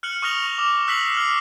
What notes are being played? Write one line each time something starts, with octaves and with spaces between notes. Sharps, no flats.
F6 F#6 C#7 F#7
C#6 D#6 F6 A#6 F7 G7
D6
E6 F#6 B6 C7 F#7
F6 C7